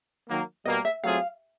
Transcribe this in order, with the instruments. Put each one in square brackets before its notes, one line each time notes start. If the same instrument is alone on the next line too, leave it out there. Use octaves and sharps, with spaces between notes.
[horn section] D#3 F#3 A#3
[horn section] B2 G3 A#3 [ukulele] D#5
[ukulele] E5
[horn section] F#3 A3 C4 F4 G#4 [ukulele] F5